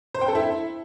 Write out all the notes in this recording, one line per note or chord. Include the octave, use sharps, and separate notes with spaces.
C5
G5
A4
E4